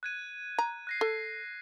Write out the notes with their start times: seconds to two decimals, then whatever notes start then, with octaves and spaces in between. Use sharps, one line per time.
0.03 F#6 G#6 D#7
0.58 A#5
0.87 F#6 A#6 C7
1.01 A4